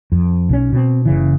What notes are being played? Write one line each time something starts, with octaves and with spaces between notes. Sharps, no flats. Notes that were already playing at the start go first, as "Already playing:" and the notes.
F2
B1 G3 C#4
B2 C4
F#1 C#3 E3